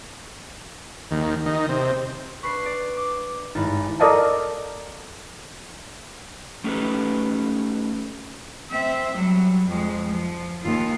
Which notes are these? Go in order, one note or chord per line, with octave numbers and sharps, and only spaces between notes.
D#2
D#3
C3
D4 B4 C#6 C7
D5
D6
G#1 G2 D#4 E4
A4 A#4 D5 D#5 F5 A5
A3 C#4 D#4 G4 A4 B4
C4 E5
F#3 G3
F2 G#3
F3
D#2 F4